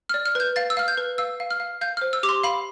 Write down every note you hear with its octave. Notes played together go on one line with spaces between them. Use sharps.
D5 F6
F6
B4 G6
F5 A6
E6
F5 F6
G6
B4
F5 E6
F5
F6
F5
F5 G6
C5 F6
E6
G4 D6
C6
F5 B5